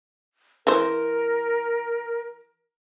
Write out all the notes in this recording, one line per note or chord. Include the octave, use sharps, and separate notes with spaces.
E3 A#4 C5